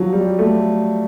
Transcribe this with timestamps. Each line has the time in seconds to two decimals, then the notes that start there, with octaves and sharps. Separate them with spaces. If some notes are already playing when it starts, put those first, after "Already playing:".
Already playing: F3 F#3
0.13 G3
0.39 A3